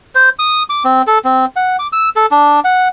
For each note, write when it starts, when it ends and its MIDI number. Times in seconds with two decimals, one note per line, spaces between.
0.15 0.29 72
0.39 0.63 87
0.70 0.83 86
0.85 1.02 60
1.07 1.18 69
1.24 1.45 60
1.56 1.77 78
1.79 1.87 86
1.93 2.09 88
2.16 2.26 69
2.31 2.60 62
2.64 2.88 78